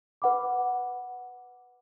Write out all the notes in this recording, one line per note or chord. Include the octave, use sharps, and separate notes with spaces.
B4 F#5 B5 D6